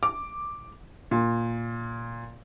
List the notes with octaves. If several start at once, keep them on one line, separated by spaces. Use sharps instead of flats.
D6
A#2